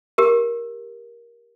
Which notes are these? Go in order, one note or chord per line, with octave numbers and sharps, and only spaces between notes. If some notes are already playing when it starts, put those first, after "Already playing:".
G4 A#4